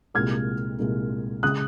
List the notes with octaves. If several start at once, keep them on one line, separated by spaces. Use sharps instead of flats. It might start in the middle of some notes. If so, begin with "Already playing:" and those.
C2 A#2 G#3 F6 G#6
C2 A#2 G#3
C#3 G#3 D#6 F#6